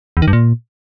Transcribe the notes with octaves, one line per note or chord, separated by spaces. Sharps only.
E2
D#3
G2
A#2